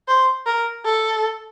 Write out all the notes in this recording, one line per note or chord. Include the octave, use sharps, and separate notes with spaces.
C5
A#4
A4